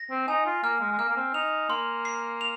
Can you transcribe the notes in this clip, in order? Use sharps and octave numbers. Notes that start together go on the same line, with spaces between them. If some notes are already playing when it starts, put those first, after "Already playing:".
Already playing: A#6
C4
D#4 G#5
F4
A#3 F6
G#3
G#3
A#3 F6
A#3
C4
D#4 F7
A#3 C6
C7
F7